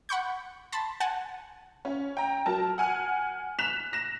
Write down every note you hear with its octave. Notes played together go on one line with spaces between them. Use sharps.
F#5 B5 C#6 G6
A5 B5 C6 A6
F#5 G#5 A5
C#4
G5 A#5
F#3 A#4 A5
F#5 G#5 F6
F#6 B6 E7 F7
A#6 E7